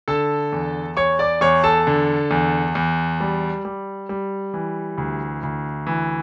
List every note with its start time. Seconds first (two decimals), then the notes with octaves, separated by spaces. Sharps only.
0.08 D3 A4 A5
0.53 E2
0.97 E2 C#5 C#6
1.19 D5 D6
1.41 E2 C#5 C#6
1.64 A4 A5
1.87 D3
2.31 E2
2.75 E2
3.20 G3
3.65 G3
4.09 G3
4.54 E3
4.98 D2
5.43 D2
5.87 E3